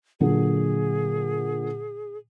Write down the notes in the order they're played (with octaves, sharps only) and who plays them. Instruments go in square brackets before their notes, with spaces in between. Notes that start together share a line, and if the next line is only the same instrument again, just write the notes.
[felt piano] A#2 D3 F#3 [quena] G#4